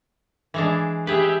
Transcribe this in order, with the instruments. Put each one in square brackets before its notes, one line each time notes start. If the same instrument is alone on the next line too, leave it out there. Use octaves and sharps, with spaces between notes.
[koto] E3 G#3 D4
[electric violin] G4 E5 [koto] G#4 B4